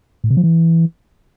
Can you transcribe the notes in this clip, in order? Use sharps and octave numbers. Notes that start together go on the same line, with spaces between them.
A2
C3
F3
E3